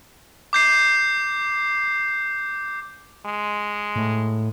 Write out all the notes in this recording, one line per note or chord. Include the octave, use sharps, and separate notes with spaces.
D6 G6 C7
G#3
A2